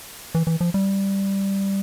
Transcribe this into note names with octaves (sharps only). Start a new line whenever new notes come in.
E3
E3
F3
G3